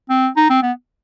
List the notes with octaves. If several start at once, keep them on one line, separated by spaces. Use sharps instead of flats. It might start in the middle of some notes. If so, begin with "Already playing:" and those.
C4
D#4
C4
B3